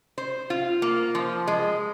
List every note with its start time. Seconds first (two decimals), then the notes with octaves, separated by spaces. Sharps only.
0.18 C5
0.50 F4
0.82 A#3
1.15 F3
1.47 G#3